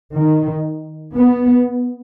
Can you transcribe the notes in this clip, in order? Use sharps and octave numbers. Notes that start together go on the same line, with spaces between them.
D#3
B3